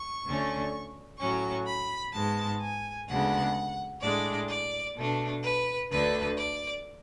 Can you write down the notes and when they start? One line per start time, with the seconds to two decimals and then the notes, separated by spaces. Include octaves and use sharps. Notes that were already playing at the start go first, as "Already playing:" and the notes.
Already playing: C#6
0.26 D2 D3 A3 C#4
1.20 A2 F#3 C#4 C#6
1.67 B5
2.14 G#2 G#3 B3 A5
2.61 G#5
3.08 D2 C#3 G#3 B3 D4 F#5
4.02 A2 G#3 D4 D5
4.49 D5
4.97 B2 A3 D4
5.44 B4
5.91 D2 D3 A3 D4 B4
6.38 D5